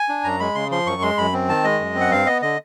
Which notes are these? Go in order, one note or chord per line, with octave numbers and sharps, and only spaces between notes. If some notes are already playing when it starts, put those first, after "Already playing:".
Already playing: G#5
D4
F#2 A#5
G#3 B5
C#3 C6
F3 C6
F#2 C#6
G#3 C6
F#2 B5
C4
D#3 A5
G#3 D#5
F#2
C4
F#5
G2 F5
B3 D#5
D3 D#5